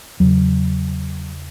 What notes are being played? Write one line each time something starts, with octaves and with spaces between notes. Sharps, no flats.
E2 C#3 F#3